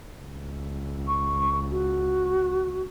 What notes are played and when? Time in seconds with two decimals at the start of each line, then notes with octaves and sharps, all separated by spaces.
0.19 C#2
1.08 C#6
1.71 F#4